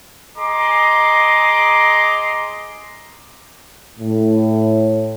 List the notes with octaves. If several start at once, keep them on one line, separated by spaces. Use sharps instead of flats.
G#4 D#5 A#5 C6 D6
A2